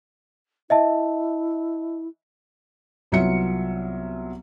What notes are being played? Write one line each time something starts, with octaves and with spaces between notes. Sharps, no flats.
E4 D#5 E5 A5
C2 F#3 B3 F4 E5 C#7